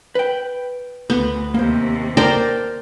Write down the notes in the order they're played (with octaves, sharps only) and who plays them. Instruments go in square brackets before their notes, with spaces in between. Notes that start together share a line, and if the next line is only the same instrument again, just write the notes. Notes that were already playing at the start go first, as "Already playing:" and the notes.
[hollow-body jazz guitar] B4 G5
[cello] D2 [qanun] B3
[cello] D#2 C3 [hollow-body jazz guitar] A#3 C5
[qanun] A#4 C5 D5 [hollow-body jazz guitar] G5 A5